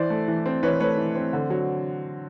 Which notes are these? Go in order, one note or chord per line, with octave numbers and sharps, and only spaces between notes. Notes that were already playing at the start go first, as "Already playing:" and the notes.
Already playing: E3 C5 D5
A3
E3
C4
E3 B4 C#5
A3 B4 C#5
E3
C4
D3
F#3